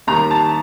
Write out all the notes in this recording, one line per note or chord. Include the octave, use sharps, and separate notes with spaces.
D#2 D#3 G3 A#5
A5